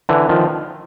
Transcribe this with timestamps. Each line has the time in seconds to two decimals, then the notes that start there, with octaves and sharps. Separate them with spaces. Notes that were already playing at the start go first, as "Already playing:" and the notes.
0.09 D3 E3
0.29 D#3 F3